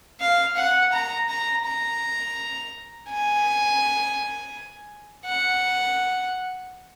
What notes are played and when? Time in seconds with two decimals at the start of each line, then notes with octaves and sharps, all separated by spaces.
0.20 F5
0.56 F#5
0.92 A#5
1.29 A#5
1.65 A#5
3.09 G#5
5.25 F#5